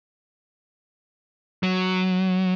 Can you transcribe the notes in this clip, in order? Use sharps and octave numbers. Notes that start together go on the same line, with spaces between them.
F#3